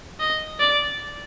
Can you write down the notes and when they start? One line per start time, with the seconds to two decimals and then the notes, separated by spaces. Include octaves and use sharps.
0.20 D#5
0.60 D5